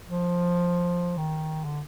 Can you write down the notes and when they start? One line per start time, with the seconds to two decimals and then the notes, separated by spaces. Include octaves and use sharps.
0.08 F3
1.18 D#3
1.65 D3